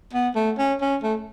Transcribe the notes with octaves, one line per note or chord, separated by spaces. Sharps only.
B3
A3
C#4
C#4
A3